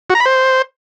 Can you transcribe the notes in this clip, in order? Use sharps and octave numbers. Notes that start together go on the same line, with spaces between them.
F#4
A#5
B5
C5